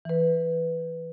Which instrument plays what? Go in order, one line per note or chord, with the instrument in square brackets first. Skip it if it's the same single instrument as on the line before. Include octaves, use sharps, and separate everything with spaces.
[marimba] E3 B4